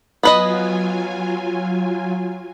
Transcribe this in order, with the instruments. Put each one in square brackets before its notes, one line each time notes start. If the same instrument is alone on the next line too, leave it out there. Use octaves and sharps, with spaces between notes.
[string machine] F#3 F4 G#5 [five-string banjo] B3 B4 D#5